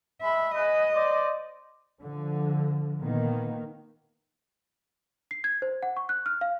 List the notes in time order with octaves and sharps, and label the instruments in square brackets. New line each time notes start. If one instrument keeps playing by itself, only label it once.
[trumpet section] G#3 B5 [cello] E5
[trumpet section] G#4 B4 [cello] D#5
[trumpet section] C5 D5
[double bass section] D3 F3
A#2 D#3 A#3 B3
[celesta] C7
G#6
C5
F#5
C#6
F#6
F6
F5